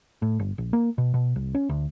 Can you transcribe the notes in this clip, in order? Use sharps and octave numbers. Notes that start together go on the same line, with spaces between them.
A2
G1
A#1
A#3
B2
B2
C2
C#4
D2